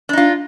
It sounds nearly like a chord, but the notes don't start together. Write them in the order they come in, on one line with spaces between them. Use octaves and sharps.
D4 D#4 F4